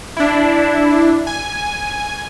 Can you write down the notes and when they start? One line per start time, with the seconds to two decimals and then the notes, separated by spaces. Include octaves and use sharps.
0.17 D4 E4
1.27 G#5